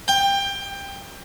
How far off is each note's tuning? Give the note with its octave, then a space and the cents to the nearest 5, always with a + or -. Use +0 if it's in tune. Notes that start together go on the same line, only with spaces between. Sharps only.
G5 +20